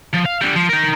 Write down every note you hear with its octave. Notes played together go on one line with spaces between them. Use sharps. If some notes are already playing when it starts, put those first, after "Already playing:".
F3
F5
D3 G3
F3
D#4 A#4